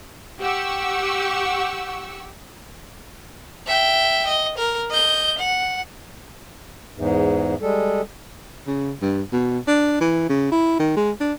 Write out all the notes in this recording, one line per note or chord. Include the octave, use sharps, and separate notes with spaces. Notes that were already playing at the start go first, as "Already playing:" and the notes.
G4 F#5 C#6 E6
E5 G5
D#5
A#4
D#5 G6
F#5
E2 G#2
G3 G#3 A4
C#3
G2
B2
D4
E3
C#3
E4
D#3
G#3
D4